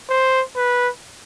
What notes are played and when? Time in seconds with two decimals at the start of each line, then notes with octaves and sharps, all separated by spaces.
0.09 C5
0.56 B4